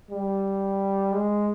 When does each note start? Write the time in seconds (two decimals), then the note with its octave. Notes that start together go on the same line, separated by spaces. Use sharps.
0.11 G3
1.13 G#3